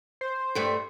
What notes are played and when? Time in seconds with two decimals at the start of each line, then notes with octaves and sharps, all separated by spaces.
0.21 C5
0.55 G2 G3 A3